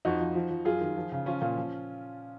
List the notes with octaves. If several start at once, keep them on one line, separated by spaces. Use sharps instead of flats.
F2 D#4 F#4
F3
F3
F3
F#2 F4 G#4
D#3
F3
C#3
F3 C#4 F4
A#2
F3